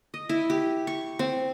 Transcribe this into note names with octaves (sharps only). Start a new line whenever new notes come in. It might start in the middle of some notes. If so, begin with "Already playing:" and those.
D#5
E4
G4
C#6
C4